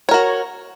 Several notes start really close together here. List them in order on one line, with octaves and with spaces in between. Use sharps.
C#5 A#4 F#4